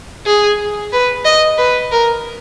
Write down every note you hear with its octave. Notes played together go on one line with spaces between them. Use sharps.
G#4
B4
D#5
B4
A#4